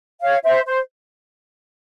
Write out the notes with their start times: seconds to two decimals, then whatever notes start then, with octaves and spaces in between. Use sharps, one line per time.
0.21 C#5 F5
0.44 C5 E5
0.66 C5